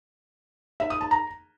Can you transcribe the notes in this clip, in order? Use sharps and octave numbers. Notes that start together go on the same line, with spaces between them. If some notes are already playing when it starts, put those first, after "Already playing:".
E5
D#6
A5
A#5